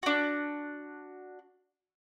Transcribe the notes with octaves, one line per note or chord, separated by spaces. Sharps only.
D4 F#4